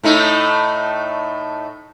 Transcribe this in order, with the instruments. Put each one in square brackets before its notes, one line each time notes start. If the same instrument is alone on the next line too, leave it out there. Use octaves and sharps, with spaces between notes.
[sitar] A2 A3 D#4